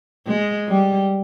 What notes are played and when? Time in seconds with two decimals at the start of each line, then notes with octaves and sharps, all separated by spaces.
0.26 G#3
0.68 G3